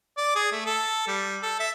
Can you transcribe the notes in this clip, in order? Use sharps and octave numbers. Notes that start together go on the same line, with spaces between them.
D5
G#4
A3
A4
G3
A4
E5